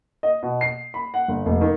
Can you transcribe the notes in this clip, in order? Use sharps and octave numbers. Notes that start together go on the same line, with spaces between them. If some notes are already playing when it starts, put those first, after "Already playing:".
D#5
B2
C7
B5
F#5
G1
F1
D#3